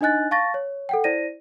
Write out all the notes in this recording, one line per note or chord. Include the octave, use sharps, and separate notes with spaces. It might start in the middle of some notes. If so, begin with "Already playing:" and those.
D4 D#4 D#5 G#5 F#6 A6
F5 A5 C#6 A6 A#6
C#5
A4 F#5 G5
E4 C5 D5 A#6 D#7